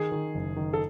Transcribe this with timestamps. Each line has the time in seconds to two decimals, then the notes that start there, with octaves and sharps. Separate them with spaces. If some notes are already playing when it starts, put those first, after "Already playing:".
Already playing: D#3 G#4
0.12 D#3
0.35 F#1
0.56 D#3
0.73 A4